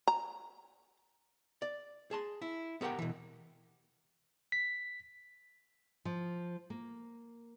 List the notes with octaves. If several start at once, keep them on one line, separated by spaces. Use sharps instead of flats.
A#5
D5
G#4 A5 C6
E4
B3 G4 A#4 F#5 G5
B2 E3
B6
F3
A#3